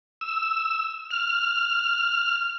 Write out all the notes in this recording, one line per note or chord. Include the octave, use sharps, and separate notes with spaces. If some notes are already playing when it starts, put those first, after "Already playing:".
E6
F6